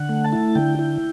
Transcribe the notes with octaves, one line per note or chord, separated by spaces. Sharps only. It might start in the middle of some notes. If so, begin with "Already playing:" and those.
Already playing: D3 F#5
A3
A5
E4
D3 G5
E4